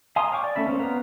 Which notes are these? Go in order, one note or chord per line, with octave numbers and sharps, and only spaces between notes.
F5 G#5 A#5 C6 D#6
C#5 F5 G5 C#6 D6
D5
A3 C#4 E5 B5
A#3 C4 C#4
B3 C4 F5 A#5